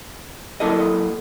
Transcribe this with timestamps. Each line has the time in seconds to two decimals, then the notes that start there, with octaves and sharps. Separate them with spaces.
0.60 F#3 A#3 E4 A4 A#4 D#5